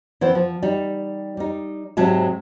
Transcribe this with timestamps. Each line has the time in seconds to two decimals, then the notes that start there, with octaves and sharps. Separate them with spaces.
0.21 E3 B3 C4 C5
0.35 F3
0.63 G3 D#4
1.37 G3 D#4
1.97 G#2 C3 F#3 G#3 A5